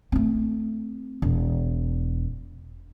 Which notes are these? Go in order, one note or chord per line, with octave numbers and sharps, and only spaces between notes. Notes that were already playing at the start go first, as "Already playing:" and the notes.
A3 C4
E1